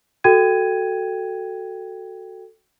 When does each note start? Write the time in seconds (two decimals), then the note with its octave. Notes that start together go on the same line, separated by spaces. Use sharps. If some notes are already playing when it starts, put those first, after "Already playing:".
0.24 F#4 A4 G5 G#6 D#7